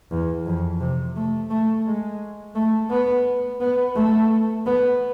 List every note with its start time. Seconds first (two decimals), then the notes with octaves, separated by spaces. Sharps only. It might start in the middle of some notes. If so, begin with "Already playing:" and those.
0.11 E2
0.46 F2
0.80 C3
1.16 A3
1.50 A3
1.86 G#3
2.55 A3
2.90 B3
3.60 B3
3.95 A3
4.66 B3